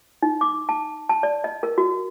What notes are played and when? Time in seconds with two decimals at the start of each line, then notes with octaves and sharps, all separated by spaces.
0.22 D#4
0.41 D6
0.69 A5
1.09 A5
1.23 D5
1.44 D#5
1.63 A#4
1.78 F#4